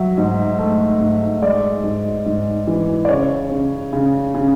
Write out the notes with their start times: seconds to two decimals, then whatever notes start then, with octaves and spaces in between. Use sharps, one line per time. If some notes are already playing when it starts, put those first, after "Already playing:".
Already playing: F#3 E5
0.18 G#2
0.59 A3
1.01 G#2
1.42 G#3 D5
1.84 G#2
2.26 G#2
2.67 E3
3.05 D5
3.09 C#3 C#5
3.51 C#3
3.93 C#3
4.35 C#3